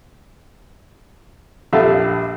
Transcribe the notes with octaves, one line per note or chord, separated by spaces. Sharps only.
A#1 G3 A4 E5 F5